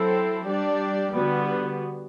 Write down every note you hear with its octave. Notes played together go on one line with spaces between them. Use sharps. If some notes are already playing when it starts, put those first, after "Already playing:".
Already playing: F#3 C4 E4 A4 C5
G3 D4 G4 D5
D3 G3 B3 F#4